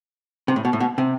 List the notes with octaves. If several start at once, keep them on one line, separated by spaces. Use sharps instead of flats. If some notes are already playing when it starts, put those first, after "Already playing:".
C3
A2
B2
A2
B2
C3